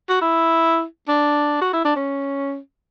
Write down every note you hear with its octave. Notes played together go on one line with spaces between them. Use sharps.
F#4
E4
D4
F#4
E4
D4
C#4